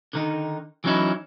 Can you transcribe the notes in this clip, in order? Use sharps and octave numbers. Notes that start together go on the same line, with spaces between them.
D3 D#3 D#4
E3 F#3 B3 C#4 D#4 E4